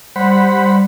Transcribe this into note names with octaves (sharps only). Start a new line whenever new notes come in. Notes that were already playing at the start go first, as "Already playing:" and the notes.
G3 C5 F#5 B5